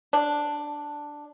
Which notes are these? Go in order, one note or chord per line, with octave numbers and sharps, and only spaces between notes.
D4